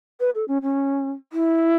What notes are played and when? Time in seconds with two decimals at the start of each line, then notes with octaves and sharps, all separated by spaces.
0.20 B4
0.35 A4
0.48 C#4
0.62 C#4
1.33 E4